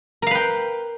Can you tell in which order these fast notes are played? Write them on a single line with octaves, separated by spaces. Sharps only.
A#4 F5 B4 G5